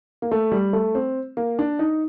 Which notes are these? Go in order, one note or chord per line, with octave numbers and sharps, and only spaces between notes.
A#3
A3
G3
A3
C4
A#3
D4
D#4